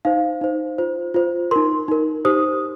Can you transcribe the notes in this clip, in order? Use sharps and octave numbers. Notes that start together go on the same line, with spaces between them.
D#4 C5 F5
D#4 C5
F4 C5
F4 C5
D#4 A#4 C6
D#4 A#4
D#4 G4 C5 D#6